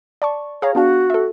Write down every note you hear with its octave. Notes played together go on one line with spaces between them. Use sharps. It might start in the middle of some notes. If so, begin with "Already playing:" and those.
D5 A5 C#6
G#4 C#5 F5 A#5
B3 D4 F#4 F5
A4 E5